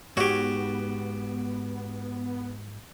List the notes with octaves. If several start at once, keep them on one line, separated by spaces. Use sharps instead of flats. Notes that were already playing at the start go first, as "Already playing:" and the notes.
G#2 B3 F#4 G4 C#5